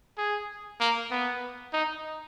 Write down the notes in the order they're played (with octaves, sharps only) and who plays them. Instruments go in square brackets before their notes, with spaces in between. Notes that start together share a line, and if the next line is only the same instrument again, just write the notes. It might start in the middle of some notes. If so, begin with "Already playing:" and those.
[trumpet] G#4
A#3
B3
D#4